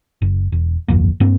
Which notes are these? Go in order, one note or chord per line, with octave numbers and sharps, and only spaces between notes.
F#1
E1
D1 G1 F2 A#3
G2 A#3 C4